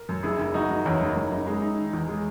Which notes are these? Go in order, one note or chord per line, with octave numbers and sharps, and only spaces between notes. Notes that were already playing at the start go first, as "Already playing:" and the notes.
Already playing: A#4
F#2
F#1 E4 G#4
F#1
F#1 D#4 F#4
F#1
E2 C#4 E4
F#1
F#1
F#1
G#3
D#4
D#3
E2
G#3